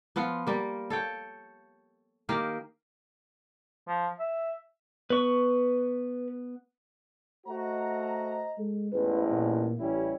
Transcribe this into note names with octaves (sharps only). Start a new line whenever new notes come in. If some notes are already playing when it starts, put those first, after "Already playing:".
F3 B3 F4 F#5
G3 A#3
A4 C#5 G5
D#3 A#3 G4 F5
F3
E5
B3 B4 C#6
A3 F#4 C5 D#5 A#5
G#3 A4
A1 E2 G#2 B4
A#2
A1 G3 C#4 E4